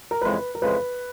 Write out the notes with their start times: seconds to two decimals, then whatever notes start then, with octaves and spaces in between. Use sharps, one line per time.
0.11 A#4
0.21 F2 C#3 E3 G#3 B4
0.55 A#4
0.62 F2 C#3 E3 G#3 B4